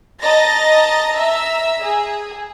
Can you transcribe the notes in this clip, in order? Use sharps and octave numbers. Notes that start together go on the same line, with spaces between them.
D#5 A5 A#5 A6 A#6
E5 A#5 E6
G#4